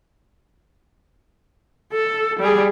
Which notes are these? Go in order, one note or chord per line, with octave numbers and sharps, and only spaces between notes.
A4
G3 G#4